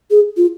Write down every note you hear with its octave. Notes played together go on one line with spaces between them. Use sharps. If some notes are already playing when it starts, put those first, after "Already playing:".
G#4
F4